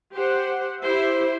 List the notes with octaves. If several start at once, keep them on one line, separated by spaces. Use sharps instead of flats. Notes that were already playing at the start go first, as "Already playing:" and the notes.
G4 C5 F#5
E4 G4 C5 E5